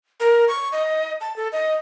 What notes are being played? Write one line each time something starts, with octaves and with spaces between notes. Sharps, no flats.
A#4
C#6
D#5
A5
A4
D#5